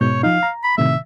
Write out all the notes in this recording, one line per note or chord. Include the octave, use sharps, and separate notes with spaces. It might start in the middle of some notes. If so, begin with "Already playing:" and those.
G#2 B2 C#5 G6
F3 D#4 F5
A#5
B5
A2 C3 D#3 E5